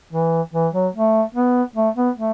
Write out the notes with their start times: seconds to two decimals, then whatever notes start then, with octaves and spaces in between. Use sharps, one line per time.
0.13 E3
0.54 E3
0.74 F#3
0.94 A3
1.34 B3
1.76 A3
1.96 B3
2.16 A3